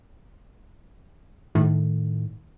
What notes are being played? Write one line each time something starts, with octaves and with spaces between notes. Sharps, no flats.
A2 D#3